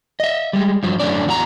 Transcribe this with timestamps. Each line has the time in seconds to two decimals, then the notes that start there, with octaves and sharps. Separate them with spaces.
0.20 D#5 E5
0.53 G3 G#3
0.83 G2 F3 F#3
1.00 F#2 E3 A3 C#4 D4 D5
1.26 E2 F#4 A#5